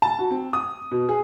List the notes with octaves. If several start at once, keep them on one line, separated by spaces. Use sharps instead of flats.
A5
F#4
C4
D#6
B2
G#4